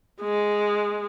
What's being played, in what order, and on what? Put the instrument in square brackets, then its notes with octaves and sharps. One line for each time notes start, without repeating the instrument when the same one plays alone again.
[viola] G#3